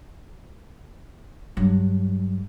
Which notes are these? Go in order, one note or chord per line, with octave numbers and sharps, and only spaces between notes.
G2 F#3